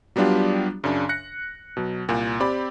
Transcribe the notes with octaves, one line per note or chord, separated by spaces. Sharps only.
F#3 G3 B3 D4 F4 G4
F#2 C#3 D4
F#6 A#6 C#7
B2 F#3
C2 A#2
C4 G4 D5 B5